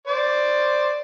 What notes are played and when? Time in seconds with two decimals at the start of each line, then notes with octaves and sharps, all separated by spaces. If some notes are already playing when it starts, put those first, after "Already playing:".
0.07 C5 D5